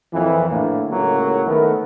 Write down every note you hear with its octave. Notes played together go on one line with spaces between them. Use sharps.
F2 A#2 E3
A2 D3 A#3
C#2 A2 F#3 A#3
D#3 A3 B3 A4 A#4